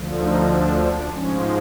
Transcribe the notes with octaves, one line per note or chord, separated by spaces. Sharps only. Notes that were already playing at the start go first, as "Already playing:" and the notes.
Already playing: D2 D3 F3
D#4
D4
D4
G#2 F3 G#3 C#4